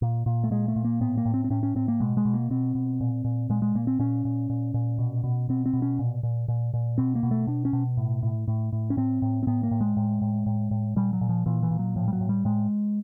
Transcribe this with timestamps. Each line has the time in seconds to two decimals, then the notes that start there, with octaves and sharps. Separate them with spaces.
0.02 A#2
0.26 A#2
0.44 A3
0.51 A#2 G#3
0.68 A3
0.76 A#2
0.85 A#3
1.01 A2 B3
1.17 A#3
1.25 A2
1.34 C4
1.44 C4
1.50 A2 C#4
1.63 C#4
1.76 A2 C4
1.88 A#3
2.00 B2 G#3
2.17 G#3
2.25 B2
2.34 A#3
2.50 B2 C4
2.75 B2
3.01 A#2
3.24 A#2
3.50 A#2 G#3
3.62 G#3
3.75 A#2 A#3
3.87 C4
3.99 A#2 C#4
4.25 A#2
4.50 A#2
4.74 A#2
4.99 B2
5.24 B2
5.49 B2 C4
5.66 C4
5.73 B2
5.82 C#4
5.99 A#2
6.23 A#2
6.48 A#2
6.74 A#2
6.98 B2 C4
7.15 A#3
7.23 B2
7.31 A3
7.47 B2 D4
7.65 C#4
7.73 B2
7.97 A2
8.23 A2
8.48 A2
8.73 A2
8.90 C#4
8.97 A2 C4
9.22 A2
9.43 C4
9.47 A2 B3
9.63 A#3
9.71 A2
9.81 G#3
9.97 A2
10.22 A2
10.46 A2
10.71 A2
10.96 A#2 G3
11.13 F#3
11.21 A#2
11.29 F3
11.46 A#2 E3
11.63 E3
11.71 A#2
11.79 F#3
11.96 A2 F3
12.08 G3
12.13 F#3
12.21 A2
12.29 G3
12.45 A2 G#3